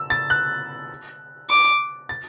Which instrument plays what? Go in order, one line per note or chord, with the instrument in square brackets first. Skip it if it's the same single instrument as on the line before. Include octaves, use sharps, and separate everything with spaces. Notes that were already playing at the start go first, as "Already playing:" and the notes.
Already playing: [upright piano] E6
A6
F#6
[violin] D6
[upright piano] A6